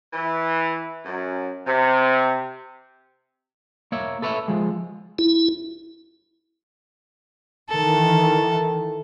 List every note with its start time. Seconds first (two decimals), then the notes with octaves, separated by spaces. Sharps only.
0.13 E3
1.05 F#2
1.67 C3
3.92 A#3 C#5 E5
4.22 A4 B4 C#5 D#5 E5
4.48 F3 G#3
5.19 E4
7.70 D#3 E3 A4